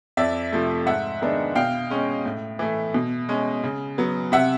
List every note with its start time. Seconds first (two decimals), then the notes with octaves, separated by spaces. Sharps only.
0.17 F2 D5 E5
0.52 C3 F3 A3
0.86 G#2 E5 F#5
1.21 D#3 G#3 B3 D4
1.55 B2 F5 G5
1.90 G#3 C#4
2.25 A2
2.59 E3 A3
2.94 B2
3.29 G#3 C#4
3.64 C#3
3.98 F#3 B3
4.32 C3 E5 F#5